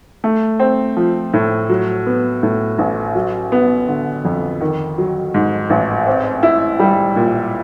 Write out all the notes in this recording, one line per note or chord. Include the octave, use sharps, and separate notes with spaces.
A3
C4
F3
A2
F#3
B3
A2
A1
F#3
B3
D3
F2
D#3
F#3
G#2
A1
C4
E4
G3
A#2